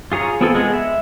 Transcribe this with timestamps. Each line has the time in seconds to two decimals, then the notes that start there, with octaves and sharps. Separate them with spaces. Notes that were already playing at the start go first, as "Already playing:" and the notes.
0.12 F4 G#4 C#5 A#5
0.41 B3 C4 F4 G#4 A4
0.55 G#3 B3 G#4
0.74 E5